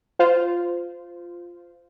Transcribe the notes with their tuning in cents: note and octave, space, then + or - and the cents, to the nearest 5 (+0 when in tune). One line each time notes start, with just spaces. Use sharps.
F4 +0 C5 -20